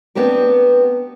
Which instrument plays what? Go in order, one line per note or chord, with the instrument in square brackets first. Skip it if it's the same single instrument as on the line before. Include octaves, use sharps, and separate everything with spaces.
[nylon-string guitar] B3 C4 D4 G4 A#4